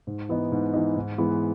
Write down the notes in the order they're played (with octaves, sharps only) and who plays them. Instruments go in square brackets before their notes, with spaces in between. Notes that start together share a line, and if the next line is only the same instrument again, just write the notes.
[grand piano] G#2
E3 B3 D#4
G#2
E3 B3 D#4
G#2
E3 G#3 B3